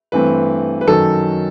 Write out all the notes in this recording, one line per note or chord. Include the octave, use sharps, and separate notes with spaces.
G2 E3 A3 C4 B4
B4
F#2 D#3 F#3 A4